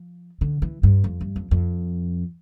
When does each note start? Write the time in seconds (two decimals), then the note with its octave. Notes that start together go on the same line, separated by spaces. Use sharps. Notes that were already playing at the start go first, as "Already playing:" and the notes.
Already playing: F3
0.41 D3
0.62 E3
0.83 G2
1.04 F2
1.21 G2
1.36 F2
1.51 F2